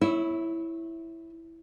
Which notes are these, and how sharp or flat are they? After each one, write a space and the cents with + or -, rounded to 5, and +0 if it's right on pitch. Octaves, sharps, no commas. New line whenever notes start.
E4 +0 C#5 -10 E5 -35